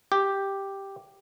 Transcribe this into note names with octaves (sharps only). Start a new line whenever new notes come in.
G4